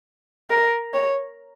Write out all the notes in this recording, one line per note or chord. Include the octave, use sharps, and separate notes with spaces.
A#4
C#5